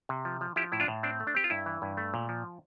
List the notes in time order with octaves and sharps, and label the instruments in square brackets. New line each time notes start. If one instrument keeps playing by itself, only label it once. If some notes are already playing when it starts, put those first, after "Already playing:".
[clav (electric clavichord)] C3
F3
F3
F3 E4 G4
A2 E4
D4 F4
A2
C4 D4
A3
D4
C4 G4
F4
G2 E4
E3
G2
A3
A#2
F3